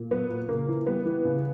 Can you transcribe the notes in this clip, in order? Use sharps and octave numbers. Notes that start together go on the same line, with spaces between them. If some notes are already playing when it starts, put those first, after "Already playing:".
Already playing: A#2
F#3 B3
A#2
C#3 A#3
E3
G3 B3
E3
C#3